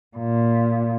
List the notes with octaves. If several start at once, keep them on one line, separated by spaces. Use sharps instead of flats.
A#2